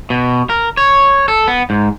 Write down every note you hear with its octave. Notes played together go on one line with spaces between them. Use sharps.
B2
A#4
C#5
A4
B3
G#2